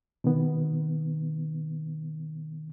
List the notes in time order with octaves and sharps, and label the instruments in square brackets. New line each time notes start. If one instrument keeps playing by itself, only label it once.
[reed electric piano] B2 D#3 B3